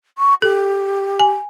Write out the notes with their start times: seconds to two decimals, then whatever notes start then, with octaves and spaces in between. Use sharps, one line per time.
0.18 C#6
0.42 G4 A4
1.20 G#5